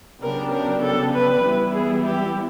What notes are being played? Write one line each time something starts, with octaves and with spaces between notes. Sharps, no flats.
C#3 F#3 B3 D4 G4 A#4
A#4
A4
B4
E3 G3 B3 E4
G#4
G4